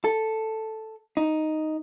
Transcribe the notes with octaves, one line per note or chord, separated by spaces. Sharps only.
A4
D#4